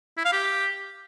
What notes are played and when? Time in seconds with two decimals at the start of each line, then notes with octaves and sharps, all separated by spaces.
0.17 E4
0.25 F5
0.32 G4